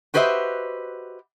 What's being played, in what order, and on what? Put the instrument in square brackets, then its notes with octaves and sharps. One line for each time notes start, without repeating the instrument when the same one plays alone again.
[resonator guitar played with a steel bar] F#4 G4 B4 C5 D#5 E5